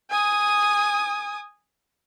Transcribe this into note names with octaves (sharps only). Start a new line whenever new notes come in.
G#5 D#6